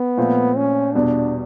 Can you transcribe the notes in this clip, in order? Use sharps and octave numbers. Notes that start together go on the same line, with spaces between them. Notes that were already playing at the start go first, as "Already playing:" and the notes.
Already playing: B3
A#2 F3 A3 C4
C#4
E2 B2 G3 D4